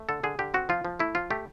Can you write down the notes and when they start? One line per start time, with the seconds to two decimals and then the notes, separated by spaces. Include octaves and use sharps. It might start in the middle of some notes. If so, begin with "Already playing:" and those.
Already playing: A3
0.09 D3 A4
0.24 D3 G#4
0.39 D3 G4
0.54 C4 F#4
0.69 F3 F4
0.85 F3
1.00 A3 E4
1.15 F3 F4
1.30 A3 G4